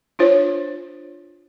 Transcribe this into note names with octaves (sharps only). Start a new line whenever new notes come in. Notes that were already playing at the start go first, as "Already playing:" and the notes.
D4 F4 C5 C#5